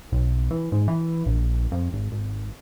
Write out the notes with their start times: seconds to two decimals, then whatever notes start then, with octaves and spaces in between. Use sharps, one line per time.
0.12 B1
0.51 E3
0.72 G#2
0.88 E3
1.26 A#1
1.72 F2
1.93 G#1
2.12 G#1